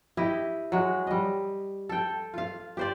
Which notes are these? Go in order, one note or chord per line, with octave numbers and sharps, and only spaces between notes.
E4 G4 D#5
F#3 G#3
G3 D#5
A4 G5
F4 F5
G4 C5 D5